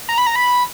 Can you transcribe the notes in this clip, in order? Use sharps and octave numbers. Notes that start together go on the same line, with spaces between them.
A#5
B5
A#5
B5